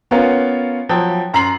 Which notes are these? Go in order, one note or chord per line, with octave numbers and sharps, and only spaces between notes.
B3 C#4 F4 A#4 F5
F3 F#3 G5
F#2 A#5 C6 C7 F#7